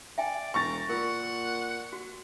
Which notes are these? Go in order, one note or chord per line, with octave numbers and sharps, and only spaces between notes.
D5 E5 G5 G#5
E1 A#5 C#6 A6
A#2 F4 A#4 F#5
F#4